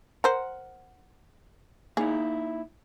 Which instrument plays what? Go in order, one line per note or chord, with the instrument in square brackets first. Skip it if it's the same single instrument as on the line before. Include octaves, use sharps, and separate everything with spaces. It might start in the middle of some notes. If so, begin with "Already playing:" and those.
[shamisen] A#4 C5 [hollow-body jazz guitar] F#5
[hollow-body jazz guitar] A#3 D#4 E4 [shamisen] G#4